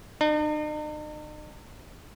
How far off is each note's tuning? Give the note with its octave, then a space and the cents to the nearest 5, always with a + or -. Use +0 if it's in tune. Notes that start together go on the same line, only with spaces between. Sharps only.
D#4 -45